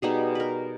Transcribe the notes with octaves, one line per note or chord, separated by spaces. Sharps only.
B2 G3 B3 D#4 G#4
A#4 B4